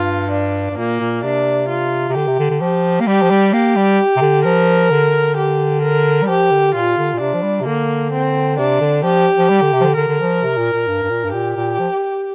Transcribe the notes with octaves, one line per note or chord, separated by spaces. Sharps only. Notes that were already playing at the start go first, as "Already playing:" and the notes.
Already playing: G2 F4
D4
G2
A#2 A#3
A#2
C3 D4
F4
C3
D3 G4
C3
D3
D3
F3 G4
A#3
G3 G4
F3
G3
A#3 G4
G3
C3
D3
F3 A#4
D3
G4
A#4
G3
F3 G4
D3
A#2 F4
D3
A#2
C3 D4
F3
G3
C3
D3 A#3
C4
C3 D4
D3
F3 G4
F3
G3
D3
C3
F3
D3
D3 A#4
D3
F3
C3
A#2
A#2
G2
G2
A#2
G2
A#2 G4
A#2
F3